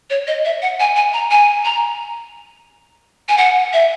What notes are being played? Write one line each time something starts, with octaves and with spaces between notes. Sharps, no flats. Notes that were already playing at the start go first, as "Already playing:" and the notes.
C#5
D#5
E5
F#5
G#5
G#5
A#5
G#5
A#5
G#5
F#5
E5